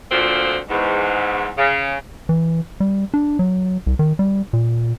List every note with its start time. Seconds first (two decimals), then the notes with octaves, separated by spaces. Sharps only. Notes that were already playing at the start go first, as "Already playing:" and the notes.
0.11 D2 A#2 D3 F3 C4
0.68 E2 G#2
1.58 C#3
2.29 E3
2.80 G3
3.14 D4
3.39 F#3
3.87 C2
3.99 D#3
4.19 G3
4.53 A#2